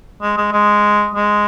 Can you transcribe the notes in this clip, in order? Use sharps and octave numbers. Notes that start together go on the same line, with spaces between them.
G#3
G#3
G#3
G#3